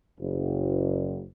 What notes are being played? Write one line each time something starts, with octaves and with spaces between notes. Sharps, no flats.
F#1